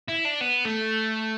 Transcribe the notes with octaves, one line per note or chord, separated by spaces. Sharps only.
E4
D4
B3
A3